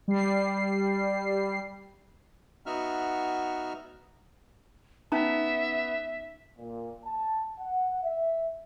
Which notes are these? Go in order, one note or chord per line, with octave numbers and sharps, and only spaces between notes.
G3 C7
B3 D#4 F#4 E5 F6
B3 C#4 D#4 E5 A#5
A#2
A5
F#5
E5